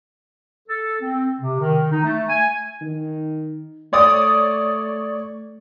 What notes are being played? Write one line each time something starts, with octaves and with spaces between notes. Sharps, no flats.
A4
C4
C3
D#3
D#4
A3
G#5
D#3
A3 C#5 D5 D#6